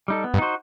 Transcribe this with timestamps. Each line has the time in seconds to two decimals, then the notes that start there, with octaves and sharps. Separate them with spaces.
0.08 G3 D#4 A4
0.24 B3
0.34 G2
0.39 D#4 F#4 C5